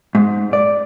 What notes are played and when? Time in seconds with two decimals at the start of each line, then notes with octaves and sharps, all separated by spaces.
0.15 G#2
0.53 D5